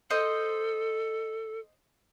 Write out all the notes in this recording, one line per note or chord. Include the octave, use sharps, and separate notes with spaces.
A4 C5 D#5